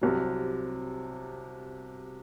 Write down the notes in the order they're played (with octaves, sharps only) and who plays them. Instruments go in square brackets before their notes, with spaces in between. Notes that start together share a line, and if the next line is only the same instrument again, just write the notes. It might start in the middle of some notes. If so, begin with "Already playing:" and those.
[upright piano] C2 C3 F#3